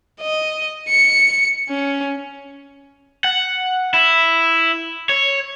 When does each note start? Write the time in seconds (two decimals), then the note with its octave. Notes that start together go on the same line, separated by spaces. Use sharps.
0.21 D#5
0.89 C#7
1.70 C#4
3.24 F#5
3.94 E4
5.09 C#5